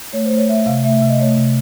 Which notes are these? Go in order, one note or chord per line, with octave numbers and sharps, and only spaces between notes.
A3 C#5
C5
A3
C#5
A3 E5
C3 F5
A3 E5
E5
C3
D#5
A3 C#5
C3